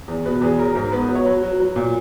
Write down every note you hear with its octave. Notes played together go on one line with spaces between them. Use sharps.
E2
B2 B4
E2 G#4
F#3 A#4
G#2 A#4
B3 B4
F#3
C#5
F#3 B4
F#3
F#3
A#2